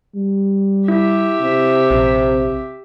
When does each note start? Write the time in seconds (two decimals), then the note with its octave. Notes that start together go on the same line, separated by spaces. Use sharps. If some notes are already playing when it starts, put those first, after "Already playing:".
0.15 G3
0.88 E4 G4 E5
1.41 C3
1.91 A#1